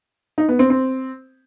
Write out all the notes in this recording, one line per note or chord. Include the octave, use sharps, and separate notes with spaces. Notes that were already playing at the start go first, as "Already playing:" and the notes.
D#4
B3
C4
C4